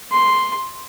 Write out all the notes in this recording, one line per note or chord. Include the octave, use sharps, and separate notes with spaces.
C6